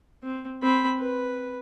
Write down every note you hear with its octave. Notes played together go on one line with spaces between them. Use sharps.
C4
C4 B5
B4